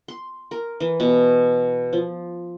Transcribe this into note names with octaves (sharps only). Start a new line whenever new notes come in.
C6
A#4
E3
B2
F3